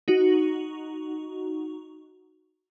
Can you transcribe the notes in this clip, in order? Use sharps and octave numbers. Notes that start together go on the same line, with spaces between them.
D#4 F#4